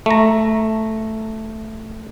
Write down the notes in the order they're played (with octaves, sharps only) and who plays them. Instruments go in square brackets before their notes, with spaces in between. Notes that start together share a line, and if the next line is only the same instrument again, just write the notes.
[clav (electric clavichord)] A3 A#5